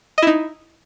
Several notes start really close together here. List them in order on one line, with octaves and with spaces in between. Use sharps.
D#5 E4 D#4